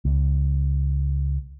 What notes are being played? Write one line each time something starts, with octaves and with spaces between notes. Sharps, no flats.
C#2